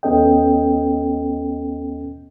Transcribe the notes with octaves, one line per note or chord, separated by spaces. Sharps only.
D#2 B3 C#4 A4 D#5 G5